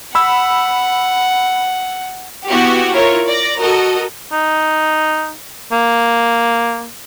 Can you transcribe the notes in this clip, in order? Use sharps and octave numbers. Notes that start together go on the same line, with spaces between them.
F#5 B5 E6
B3 E4 F#4 G4
E4 F4 A#4 C#5
D5 A#6
F#4 A4 A#4 D#5
D#4
A#3